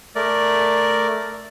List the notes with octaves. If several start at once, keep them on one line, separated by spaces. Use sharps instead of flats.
A3 A#4 D5